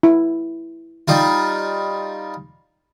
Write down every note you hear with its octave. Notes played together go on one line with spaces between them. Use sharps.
E4
G3 D#4 F4